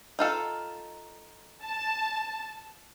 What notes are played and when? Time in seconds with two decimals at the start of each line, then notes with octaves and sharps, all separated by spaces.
0.19 D#4 F4 A4
1.63 A5